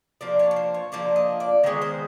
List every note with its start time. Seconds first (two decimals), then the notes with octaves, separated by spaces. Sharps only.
0.21 F3 A#3 D4 D5
0.39 C#5
0.51 C#5
0.56 C5
0.74 C#5
0.92 F3 A#3 D4 D5
1.16 D#5
1.40 D5
1.63 D#3 G#3 B3 C#5
1.81 C5